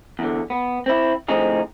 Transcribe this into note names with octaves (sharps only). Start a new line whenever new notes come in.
E2 D3
B3
C4 E4
A2 D3 F3 C4 D#4 G#4